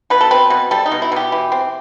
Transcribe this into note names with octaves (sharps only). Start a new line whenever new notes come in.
B2 B4
A4
C4 B4
B2
G3 A4
D#4
B2
E4
B2 G4
E3
C4